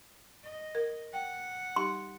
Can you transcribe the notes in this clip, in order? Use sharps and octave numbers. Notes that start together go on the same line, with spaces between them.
D#5
A#4
F#5 G5
G3 D#4 G4 C6